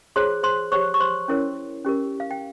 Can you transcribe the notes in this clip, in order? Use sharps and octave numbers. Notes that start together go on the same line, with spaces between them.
F4 G#4 C5 C#5 C6
C5 C6
G4 C5 C#5 C#6
C#6
C5 C6
C#4 E4 A#4 C#5
C#4 G4 A#4
F5
G5